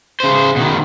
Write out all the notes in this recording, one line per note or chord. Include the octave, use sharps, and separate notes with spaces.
C#3 C5
B2 D#3